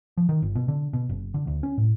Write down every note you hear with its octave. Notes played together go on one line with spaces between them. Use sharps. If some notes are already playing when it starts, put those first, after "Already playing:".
F3
D#3
G1
B2
D3
B2
F#1
D3
D2
C#4
A2